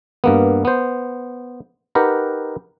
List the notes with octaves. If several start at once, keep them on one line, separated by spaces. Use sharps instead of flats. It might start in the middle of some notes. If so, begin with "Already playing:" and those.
G2 A#3 B3
B3 C5
D#4 G4 A#4 B4 F#5